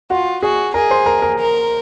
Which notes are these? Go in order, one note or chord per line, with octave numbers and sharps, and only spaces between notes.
F4 F#4 F#5
F#4 G#4 G#5
G#4 A#4 A#5
C5 C6
A#4 A#5
A#4 A#5
A#4